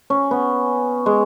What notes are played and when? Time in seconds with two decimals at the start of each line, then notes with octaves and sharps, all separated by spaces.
0.10 C#4
0.31 B3
1.06 G#3